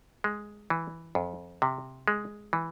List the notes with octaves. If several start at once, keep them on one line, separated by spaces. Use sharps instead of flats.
G#3
E3
F2
C3
G#3
E3